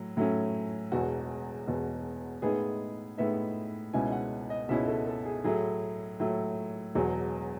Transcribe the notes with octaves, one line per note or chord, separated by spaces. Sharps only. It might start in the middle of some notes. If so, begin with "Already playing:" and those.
Already playing: A2 F#3
A2 F#3 A3 C#4
E1 E2 B2 F#4
E1 E2 B2
A2 G#3 B3 D#4 G#4
A2 G#3 B3 D#4 E5
C#2 B2 G#3 C#4 E4 G#5
F#5
D#5
C#2 B2 G#3 C#4 E4 E5
A4
A4
G#4
A2 F#3 A3 G#4
A2 F#3 A3
E1 E2 B2 F#3